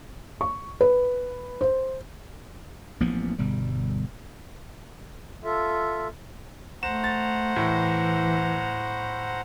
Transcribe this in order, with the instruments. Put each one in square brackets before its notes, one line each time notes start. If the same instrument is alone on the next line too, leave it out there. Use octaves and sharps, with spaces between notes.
[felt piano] C#6
B4
C5
[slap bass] A1 F3 A#3 B3
G1 B2 G3
[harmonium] F4 A4 E5
[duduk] A3 [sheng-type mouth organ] C5 F#5 A#5 [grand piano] E7
[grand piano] A6
[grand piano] A2 [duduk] E3